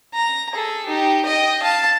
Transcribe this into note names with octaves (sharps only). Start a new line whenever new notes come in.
A#5
G#4 A4
D#4 G4
D#5 G5
F5 A5